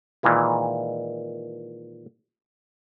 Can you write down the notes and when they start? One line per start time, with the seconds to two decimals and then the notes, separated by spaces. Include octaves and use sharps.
0.23 A#2 D#3 E3 G#3